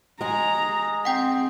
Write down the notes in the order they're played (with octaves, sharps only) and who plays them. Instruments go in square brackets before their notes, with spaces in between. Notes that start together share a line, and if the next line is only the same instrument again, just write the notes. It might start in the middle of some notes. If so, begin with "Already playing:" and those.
[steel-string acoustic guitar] G#3 G#4 [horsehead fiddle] A#5
[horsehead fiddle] C4 [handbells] F#5 G5 G6